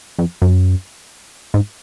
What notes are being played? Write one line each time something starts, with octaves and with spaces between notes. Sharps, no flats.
F2
F#2
G#2